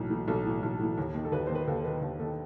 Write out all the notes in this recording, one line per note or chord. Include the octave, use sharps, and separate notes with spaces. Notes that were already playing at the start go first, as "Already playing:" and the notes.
Already playing: B1 A2 E3
A2 E3
B1 A4
A2 E3
B1
A2 E3
D#2
D#3
A4
D#2 B4
D#3 C5
B4
D#2 A4
D#3 B4
D#2
D#3 A4